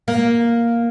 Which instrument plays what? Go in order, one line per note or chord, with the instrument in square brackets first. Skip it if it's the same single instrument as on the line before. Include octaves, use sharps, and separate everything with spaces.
[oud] A#3